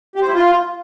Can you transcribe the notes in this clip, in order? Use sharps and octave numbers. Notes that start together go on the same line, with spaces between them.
G4
C5
E4
F4